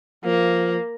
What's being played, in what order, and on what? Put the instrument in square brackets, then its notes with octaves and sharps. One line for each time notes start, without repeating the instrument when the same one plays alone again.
[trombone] F3 [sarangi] A#3